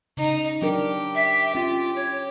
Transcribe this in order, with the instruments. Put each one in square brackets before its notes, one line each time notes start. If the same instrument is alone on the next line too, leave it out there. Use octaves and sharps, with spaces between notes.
[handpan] C#3 [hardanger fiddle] D#4
[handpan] F#3 D4 A#4 [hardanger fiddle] G4
[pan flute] E5
[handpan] C#4 [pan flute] F4
[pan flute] C#5